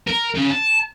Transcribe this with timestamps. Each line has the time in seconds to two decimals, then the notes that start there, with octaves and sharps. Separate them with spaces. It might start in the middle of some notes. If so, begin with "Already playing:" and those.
0.07 A#4
0.35 C#3
0.51 A5